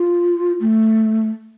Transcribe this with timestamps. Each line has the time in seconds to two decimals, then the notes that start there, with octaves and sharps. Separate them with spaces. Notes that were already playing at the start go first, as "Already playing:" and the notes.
Already playing: F4
0.60 A3